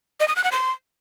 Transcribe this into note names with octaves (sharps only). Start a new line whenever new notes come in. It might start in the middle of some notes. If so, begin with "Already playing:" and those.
D#5
D#6
F#6
F#5
C6